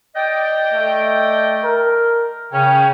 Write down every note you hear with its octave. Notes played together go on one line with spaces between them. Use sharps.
D5 D#5 G5
A3
A#4
C#3 C#4 G5